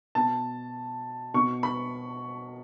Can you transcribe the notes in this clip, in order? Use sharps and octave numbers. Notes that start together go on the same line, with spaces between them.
B2 A5
B2 C#6
B5